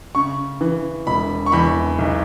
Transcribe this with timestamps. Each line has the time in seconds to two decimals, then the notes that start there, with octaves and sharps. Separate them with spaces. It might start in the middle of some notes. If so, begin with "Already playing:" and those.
0.15 C#3 C#6
0.61 E3
1.07 E1 B5
1.46 C#6
1.52 E2 B5
1.99 B1